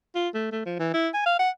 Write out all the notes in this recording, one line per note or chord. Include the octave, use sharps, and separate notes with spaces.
F4
A3
A3
F3
E3
E4
G#5
F5
F#5